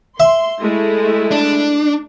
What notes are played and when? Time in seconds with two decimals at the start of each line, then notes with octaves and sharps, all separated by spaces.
0.20 E5 C6
0.61 G#3 A3 E4
1.31 D4